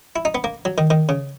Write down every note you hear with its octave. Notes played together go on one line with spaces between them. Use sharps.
E4
D#4
B3
A#3
F#3
D#3
D#3
C#3